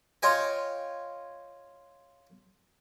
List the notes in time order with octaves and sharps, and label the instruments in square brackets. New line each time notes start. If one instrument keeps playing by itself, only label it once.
[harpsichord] F4 C#5 D#5 G5 G#5